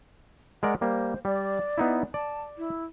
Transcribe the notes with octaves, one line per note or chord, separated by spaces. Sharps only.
G#3 A#4 D5 F#5
G3 A#3 C5
G3 D5
B3 D#4 E4
D5 A5
E4